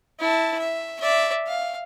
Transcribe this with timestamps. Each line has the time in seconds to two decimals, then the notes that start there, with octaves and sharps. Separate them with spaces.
0.20 E4 A5
0.59 E5
1.00 D5 E5
1.47 F5